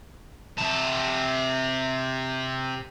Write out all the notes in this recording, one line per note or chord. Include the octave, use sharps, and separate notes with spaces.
C3 A5